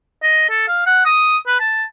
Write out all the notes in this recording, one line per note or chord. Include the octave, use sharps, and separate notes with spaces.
D#5
A4
F5
F#5
D#6
B4
A5